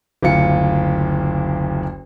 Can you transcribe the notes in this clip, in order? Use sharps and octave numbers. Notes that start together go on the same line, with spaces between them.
F#1 D2 F4 C#7